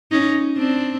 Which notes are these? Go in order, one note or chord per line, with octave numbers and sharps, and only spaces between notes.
C#4 D#4
C4 D4